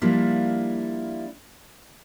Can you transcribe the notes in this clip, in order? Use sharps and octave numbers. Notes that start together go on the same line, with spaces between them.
F3 G3 A#3 D4 E4 F4